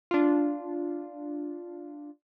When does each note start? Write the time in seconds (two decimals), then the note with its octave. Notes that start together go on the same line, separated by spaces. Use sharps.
0.11 D4 F4